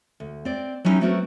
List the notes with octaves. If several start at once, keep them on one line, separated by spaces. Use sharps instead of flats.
D2
C4 D5
F#3 G3 C#4 D#4 E4 G4
F#3 A3 B3 C4 F#4 A#4